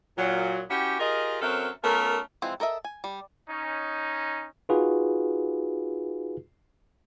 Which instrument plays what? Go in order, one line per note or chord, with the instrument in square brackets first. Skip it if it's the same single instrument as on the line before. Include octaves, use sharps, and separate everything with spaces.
[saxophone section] A#2 F#3
C#4 E4 F#4 G4
F4 G4 G#4 A#4 D#5
F#3 C4 C#4 A4 A#4 E5
A3 B3 C#4 F4 A#4
[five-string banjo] E3 F3 G#3 C4
A4 A#4 D#5 E5
G#5
G3
[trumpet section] C#4 D#4
[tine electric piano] D#4 F4 F#4 G#4 B4